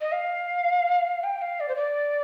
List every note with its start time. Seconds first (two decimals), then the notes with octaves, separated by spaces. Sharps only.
0.01 D#5
0.12 F5
1.24 G5
1.42 F5
1.60 D5
1.68 C5
1.75 D5